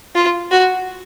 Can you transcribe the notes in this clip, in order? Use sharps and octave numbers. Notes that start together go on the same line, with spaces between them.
F4
F#4